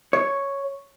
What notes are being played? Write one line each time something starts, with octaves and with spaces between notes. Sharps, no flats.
C#5